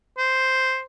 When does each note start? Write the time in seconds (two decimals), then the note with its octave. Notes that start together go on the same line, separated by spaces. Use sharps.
0.18 C5